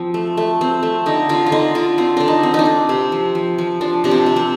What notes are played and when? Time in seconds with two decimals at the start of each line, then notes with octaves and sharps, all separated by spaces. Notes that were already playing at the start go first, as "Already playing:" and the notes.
Already playing: F3 C4
0.14 A3
0.37 A3
0.61 C4
0.83 A3
1.06 D3 D#4
1.29 D3 F4
1.46 F4
1.52 D3 D#4
1.75 D3 F4
1.98 C4 F4
2.17 D3 D4
2.28 D#4
2.43 C4
2.54 D4 D#4
2.66 C4
2.89 C3 C4
3.12 F3
3.35 F3
3.58 F3
3.81 F3 D4
4.04 C3 D4
4.11 C4
4.26 C3
4.36 C4